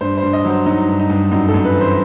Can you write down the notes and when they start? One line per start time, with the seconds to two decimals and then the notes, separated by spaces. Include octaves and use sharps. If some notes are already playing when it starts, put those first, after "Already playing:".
0.01 G2 C5
0.17 C5
0.23 G2
0.33 D#5
0.45 F#3 C5
0.66 F#3 D#4
0.88 G2
1.00 D#4
1.10 G2
1.31 F#2 D#4
1.48 A4
1.54 F#2
1.65 B4
1.75 E3
1.81 C5